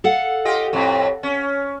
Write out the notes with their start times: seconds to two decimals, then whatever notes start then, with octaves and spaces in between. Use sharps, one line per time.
0.04 A4 F5 F#5
0.45 F4 G4 D#5
0.73 F2 A2
1.23 C#4